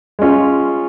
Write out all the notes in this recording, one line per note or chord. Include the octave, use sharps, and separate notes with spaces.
G#3 C#4 F4